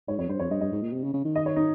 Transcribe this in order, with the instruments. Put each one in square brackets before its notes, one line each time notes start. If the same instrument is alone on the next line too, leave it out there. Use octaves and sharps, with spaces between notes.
[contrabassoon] G#2 [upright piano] C#5
[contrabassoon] F2 [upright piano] C#5
[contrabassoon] G2 [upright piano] C5
[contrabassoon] F2 [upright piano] C#5
[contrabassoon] G2 [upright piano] D#5
[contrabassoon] G2 [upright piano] D#5
[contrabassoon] G#2
A#2
C3
C#3
C#3
D#3
[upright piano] D#5
C#5
D#4